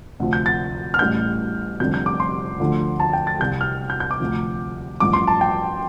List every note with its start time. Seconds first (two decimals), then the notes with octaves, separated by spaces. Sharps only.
0.20 D2 C3 F3
0.33 G6
0.46 A6
0.94 F6
0.99 A1 A2 G3 G6
1.80 F1 F2 D3 G3 G6
1.94 G6
2.06 D6
2.20 C6
2.60 D2 D3 F3
3.00 A5
3.13 G5
3.27 A6
3.40 C2 C3 G3 G6
3.61 F6
3.90 G6
4.00 G6
4.11 D6
4.20 D2 C3 F3
5.00 A1 G2 F3 D6
5.13 C6
5.27 A5
5.41 G5